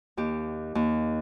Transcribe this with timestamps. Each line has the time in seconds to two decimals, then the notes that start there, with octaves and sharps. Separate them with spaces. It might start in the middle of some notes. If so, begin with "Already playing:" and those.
0.17 D#2 G4
0.75 D#2